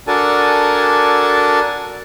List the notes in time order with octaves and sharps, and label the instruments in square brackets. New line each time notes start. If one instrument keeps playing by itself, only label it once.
[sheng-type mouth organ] D4 F#4 A4 A#4 G#5 A5